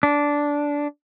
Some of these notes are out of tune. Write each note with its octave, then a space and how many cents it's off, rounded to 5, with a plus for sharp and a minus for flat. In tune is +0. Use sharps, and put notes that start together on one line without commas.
D4 -10